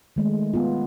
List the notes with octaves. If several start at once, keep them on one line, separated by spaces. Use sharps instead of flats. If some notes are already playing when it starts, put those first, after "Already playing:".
D#3 G#3 A3
B3 F4